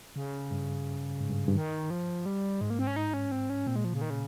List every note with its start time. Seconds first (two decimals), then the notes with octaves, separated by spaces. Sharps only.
0.16 C#3
0.51 G2
1.20 G#2
1.29 G2
1.47 G2
1.56 D#3
1.90 F3
2.26 G3
2.61 G#2 G#3
2.70 A#3
2.79 C4
2.87 C#4
2.96 D#4
3.14 C#4
3.32 C4
3.50 C#4
3.67 A#2 C4
3.76 G#3
3.84 F3
3.94 C#3
4.01 D#3
4.10 C#3